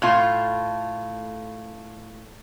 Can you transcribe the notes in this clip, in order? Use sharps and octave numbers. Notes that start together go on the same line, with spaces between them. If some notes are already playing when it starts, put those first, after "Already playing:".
A2 A3 F4